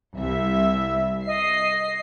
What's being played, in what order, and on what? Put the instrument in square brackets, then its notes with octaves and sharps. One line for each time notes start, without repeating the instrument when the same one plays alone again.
[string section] C2 E5
[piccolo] D#5 [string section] C7